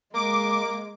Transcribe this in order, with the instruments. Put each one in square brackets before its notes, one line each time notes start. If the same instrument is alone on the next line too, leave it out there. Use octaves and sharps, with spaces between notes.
[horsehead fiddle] G#3 [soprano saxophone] A#3 [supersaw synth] D6